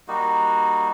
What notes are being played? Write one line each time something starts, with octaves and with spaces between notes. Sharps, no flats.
G3 A#3 D#4 F#4